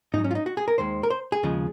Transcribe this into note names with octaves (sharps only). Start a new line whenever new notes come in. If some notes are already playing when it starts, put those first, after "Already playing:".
G#2 F#3 D#4
C#4
F4
D#4
F#4
G#4
A#4
D#2 D#3 G#3 C5
A#4
C5
G#4
D#2 C#3 F3 G#3